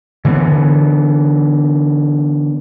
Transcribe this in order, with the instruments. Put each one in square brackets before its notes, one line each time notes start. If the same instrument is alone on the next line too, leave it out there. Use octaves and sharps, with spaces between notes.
[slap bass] D3 E3 G#3 B3